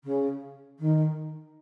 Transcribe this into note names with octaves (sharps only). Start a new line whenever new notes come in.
C#3
D#3